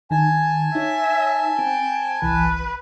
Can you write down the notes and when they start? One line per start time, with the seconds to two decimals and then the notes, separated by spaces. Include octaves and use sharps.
0.11 D#3 D#4 G#5 A5
0.75 D#4 C#5 E5
1.59 C4 G5
2.22 G1 C2 E3 B4